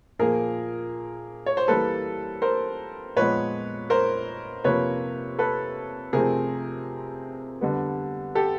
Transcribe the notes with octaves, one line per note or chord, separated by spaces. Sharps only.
A#2 F3 A#3 G#4 A#4
C#5
C5
E3 G3 A#3 A4 B4
A#4 C5
A#2 F3 G#3 B3 B4 C#5
A#4 C5
C3 F3 A#3 B4 C#5
A4 B4
C3 F3 A3 C4 G#4 A#4
D3 G3 B3
G4 A4